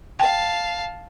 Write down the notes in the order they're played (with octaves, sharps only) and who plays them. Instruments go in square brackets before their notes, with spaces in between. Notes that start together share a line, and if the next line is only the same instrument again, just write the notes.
[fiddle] F5 A5 [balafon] G5